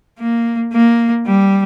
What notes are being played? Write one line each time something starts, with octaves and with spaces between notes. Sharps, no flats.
A#3
A#3
G3